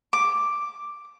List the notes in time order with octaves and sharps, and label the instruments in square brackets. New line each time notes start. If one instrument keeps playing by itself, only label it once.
[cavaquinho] D6